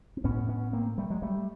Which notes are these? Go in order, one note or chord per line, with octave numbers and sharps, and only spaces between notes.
C4
A2 B3 C#4
B3 C#4
A#3 C4
G3 A3
F#3 G#3
G3 A3